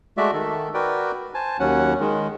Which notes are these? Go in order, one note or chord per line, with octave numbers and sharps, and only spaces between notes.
G#3 A3 F#4 D5 E5
D#3 A4
F#4 A#4 B4 D5 G5
C5 G#5 A5
D#2 F#3 C#4 F#5
D#3 G#3